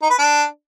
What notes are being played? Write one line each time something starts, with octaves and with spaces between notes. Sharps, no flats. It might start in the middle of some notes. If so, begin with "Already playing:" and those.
D#4
B4
D4